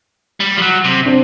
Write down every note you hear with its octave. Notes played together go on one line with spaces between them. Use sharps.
G3
F3
F#3
C3
C4 D4